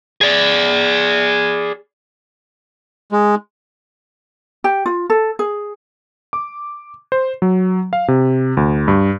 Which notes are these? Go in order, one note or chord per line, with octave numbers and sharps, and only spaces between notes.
G#4 D5
G#3
G4
F4
A4
G#4
D6
C5
F#3
F5
C3
D2
G2